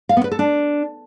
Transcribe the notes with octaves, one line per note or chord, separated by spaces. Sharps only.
F5
B3
B4
A4
D4